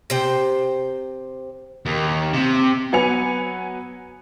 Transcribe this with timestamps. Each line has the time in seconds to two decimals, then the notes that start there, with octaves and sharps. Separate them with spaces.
0.10 C3 C5 G5
1.86 D#2
2.33 C3
2.93 F#3 B3 B4 G#5 C#7 F7